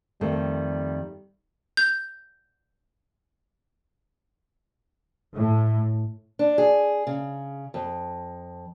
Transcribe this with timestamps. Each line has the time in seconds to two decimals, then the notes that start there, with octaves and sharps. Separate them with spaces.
0.21 F2 D#3 G3 A3
1.77 G6
5.36 A2
6.39 D4
6.58 G#4
7.07 C#3
7.74 F2